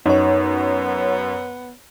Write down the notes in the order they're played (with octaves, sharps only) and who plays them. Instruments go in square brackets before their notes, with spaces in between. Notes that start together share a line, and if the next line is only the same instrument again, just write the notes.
[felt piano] F#2 [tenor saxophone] B3 [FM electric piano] D#4 C#5